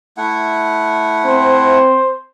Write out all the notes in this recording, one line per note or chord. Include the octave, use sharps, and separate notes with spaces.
A3 E4 F#5
C4 C5